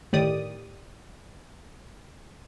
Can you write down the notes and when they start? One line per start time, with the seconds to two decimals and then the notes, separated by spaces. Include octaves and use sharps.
0.13 G1 A2 D#3 G4 D5 D#6